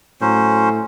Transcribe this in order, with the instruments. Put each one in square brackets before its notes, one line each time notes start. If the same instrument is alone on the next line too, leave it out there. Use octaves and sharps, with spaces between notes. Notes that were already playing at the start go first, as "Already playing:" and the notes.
[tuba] A2 [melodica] F#3 C#4 C5